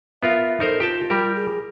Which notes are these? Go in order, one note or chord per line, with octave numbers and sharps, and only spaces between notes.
B3 F4 A#4 E5
D#4 A4 A#4 C5
F4 G4 G5 A5
G3 G4 A#4
G#4